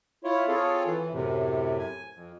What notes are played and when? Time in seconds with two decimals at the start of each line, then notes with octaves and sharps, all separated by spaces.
0.24 E4 F4 C#5
0.48 C4 F4 G#4 A4 C#5
0.87 E3
1.13 F#2 A2 C3
1.79 G#5
2.15 F2